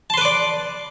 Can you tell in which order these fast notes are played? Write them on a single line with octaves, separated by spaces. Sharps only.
A5 C6 B4 D6 D5